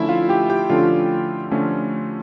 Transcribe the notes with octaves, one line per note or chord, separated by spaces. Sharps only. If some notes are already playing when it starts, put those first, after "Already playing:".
Already playing: D3 F3 A3 C#4 E4 E5
F4 F5
G4 G5
G4 G5
D3 F3 A3 C#4 F4 F5
D3 F3 A3 C#4